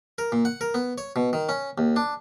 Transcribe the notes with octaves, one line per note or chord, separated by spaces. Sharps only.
A#4
A#2
F#5
A#4
B3
C#5
B2
D#3
C#4
D#2
D4